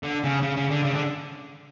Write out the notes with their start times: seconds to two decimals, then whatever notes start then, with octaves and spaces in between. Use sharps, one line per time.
0.03 D3
0.24 C#3
0.43 C#3
0.57 C#3
0.71 D3
0.85 C#3
0.95 D3